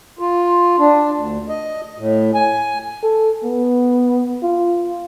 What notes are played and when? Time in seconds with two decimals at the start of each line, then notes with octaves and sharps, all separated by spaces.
0.19 F4
0.79 D4
1.16 D2
1.49 D#5
1.98 A2
2.35 G#5
3.03 A4
3.44 B3
4.43 F4